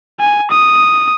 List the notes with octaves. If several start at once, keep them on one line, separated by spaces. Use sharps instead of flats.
G#5
D#6